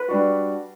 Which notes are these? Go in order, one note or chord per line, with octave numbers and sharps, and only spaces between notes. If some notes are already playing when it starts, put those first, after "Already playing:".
Already playing: B4
G3 D4 F#4